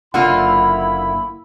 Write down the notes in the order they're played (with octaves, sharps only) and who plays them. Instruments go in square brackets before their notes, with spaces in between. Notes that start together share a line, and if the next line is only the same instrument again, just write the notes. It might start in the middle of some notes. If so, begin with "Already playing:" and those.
[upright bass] F#1 [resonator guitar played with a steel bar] D3 A#3 F4 [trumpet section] E4 B5 [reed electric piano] F#5